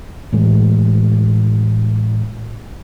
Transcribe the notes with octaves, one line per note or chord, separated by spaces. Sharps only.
A2 E3 G#3